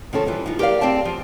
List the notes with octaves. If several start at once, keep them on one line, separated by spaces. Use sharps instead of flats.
D#3 F3 C#4 A4
E3 F3 G3
F3 D#4
G4 A#4 B4 D5 F5
C4 D5 G5 A5
F3